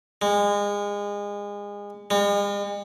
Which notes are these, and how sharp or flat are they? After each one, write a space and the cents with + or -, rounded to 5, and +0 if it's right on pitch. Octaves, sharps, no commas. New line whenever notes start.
G#3 -30
G#3 -45